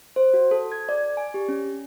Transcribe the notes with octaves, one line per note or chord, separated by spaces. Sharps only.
C5
F#4
A4
G#6
D5
G#5
G4
C#4